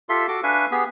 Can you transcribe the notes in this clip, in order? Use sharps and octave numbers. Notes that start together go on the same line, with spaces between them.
F4 G4 A4 E5 C6
F#4 A4 D6
D4 B4 E5 F5 G#5 C#6
B3 G4 G#4